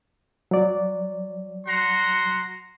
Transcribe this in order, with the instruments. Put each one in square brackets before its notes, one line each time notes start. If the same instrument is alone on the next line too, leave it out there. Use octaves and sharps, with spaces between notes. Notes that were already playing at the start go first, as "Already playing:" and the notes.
[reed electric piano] F#3 D5
[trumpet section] F#4 A#5 C6